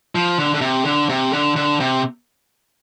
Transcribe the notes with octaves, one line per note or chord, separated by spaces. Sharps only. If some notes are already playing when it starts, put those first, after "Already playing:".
F3
D3
D3
C3
D3
C3
D3
D3
C3